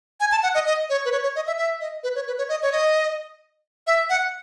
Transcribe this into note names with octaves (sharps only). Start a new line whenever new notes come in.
G#5
A5
F#5
D#5
D#5
C#5
B4
C#5
C#5
D#5
E5
E5
D#5
B4
C#5
B4
C#5
D#5
C#5
D#5
E5
F#5